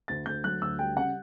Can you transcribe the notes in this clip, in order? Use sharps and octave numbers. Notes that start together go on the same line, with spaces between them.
D2 A6
D2 G6
F#3 F#6
D2 E6
G3 G5
C#3 F#5